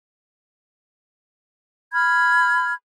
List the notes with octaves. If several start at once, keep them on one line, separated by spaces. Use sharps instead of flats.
B5 F6 G#6